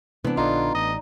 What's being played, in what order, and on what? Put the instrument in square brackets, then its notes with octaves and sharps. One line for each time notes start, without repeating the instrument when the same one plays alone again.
[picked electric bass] C3 E3 [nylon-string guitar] B3 D4
[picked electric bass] A#1 D3 [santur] D#4 D5 [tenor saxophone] F4
[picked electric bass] A1 [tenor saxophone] D#5